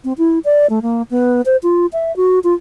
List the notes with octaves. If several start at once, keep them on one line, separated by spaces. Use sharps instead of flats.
C4
E4
D5
A3
A#3
B3
C5
F4
E5
F#4
F4